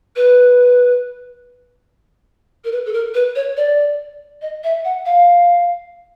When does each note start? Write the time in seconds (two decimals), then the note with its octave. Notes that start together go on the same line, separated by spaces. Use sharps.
0.16 B4
2.65 A#4
2.72 B4
2.86 A4
2.93 A#4
3.14 B4
3.36 C#5
3.57 D5
4.42 D#5
4.64 E5
4.85 F#5
5.06 F5